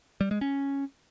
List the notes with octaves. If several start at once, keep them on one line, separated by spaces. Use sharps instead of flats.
G3
G#3
C#4